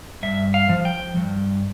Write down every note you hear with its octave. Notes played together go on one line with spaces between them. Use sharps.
G2 E5
F5
F3
G5
G2